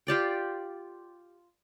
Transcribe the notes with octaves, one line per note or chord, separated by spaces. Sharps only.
F4 G4 D5 G5